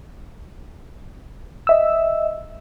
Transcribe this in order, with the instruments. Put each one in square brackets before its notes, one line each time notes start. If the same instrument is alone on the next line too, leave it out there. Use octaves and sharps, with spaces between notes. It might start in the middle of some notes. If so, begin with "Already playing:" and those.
[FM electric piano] D#5 E5 E6